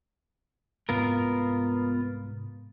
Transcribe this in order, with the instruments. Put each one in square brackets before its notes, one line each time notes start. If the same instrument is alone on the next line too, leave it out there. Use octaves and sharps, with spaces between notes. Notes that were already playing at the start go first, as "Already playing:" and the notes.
[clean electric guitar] C2 G#2 [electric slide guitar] B3 F4 A#4